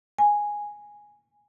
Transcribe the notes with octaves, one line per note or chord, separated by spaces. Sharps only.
G#5